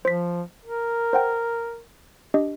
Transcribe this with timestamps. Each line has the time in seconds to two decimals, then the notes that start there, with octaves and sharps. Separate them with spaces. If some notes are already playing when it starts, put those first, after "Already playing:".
0.05 F3 C5 B6
0.65 A#4
1.13 C5 F#5 G5
2.34 D4 G4 D#5